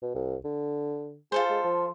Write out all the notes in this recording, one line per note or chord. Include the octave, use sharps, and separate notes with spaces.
B2
C2
D3
F4 G#4 A4 C5
G#3
F3